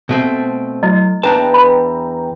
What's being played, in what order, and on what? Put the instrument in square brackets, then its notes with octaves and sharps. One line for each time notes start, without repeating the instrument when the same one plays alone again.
[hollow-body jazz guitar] B2 A3 C4
[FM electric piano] F#3 A3 [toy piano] E4 D#5
[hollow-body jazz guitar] E2 D4 A5 [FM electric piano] B4 G5 A#5
[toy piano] B5